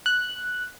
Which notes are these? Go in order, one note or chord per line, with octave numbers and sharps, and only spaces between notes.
F#6